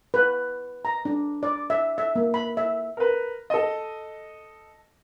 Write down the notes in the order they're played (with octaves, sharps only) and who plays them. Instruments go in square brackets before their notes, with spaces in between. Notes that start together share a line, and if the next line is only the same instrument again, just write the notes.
[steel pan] B4
A#5
D4
D5
E5
E5
A#3
B5
E5
[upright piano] A#4 B4
A4 D#5